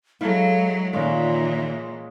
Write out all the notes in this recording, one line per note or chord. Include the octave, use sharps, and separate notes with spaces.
F#3 G#3 E4 A4 F5 A#5
A#2 D#3 E3 G#3 C#4 F4 D5